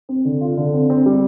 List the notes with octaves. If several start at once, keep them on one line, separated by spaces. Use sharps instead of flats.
C4
D3
F4
D3
C4
C4
G3